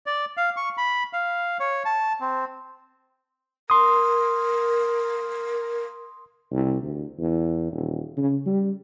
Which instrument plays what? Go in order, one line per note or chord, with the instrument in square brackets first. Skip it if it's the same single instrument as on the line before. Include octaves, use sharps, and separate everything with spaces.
[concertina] D5
F5
C#6
B5
F5
C#5
A5
C4
[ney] A#4 [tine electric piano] C6 D#6
[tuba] C2
D2
E2
D#1
C#3
G3